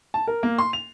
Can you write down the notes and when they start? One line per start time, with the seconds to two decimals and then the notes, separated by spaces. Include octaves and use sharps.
0.14 A5
0.27 A#4
0.43 A#3
0.59 C6
0.73 F7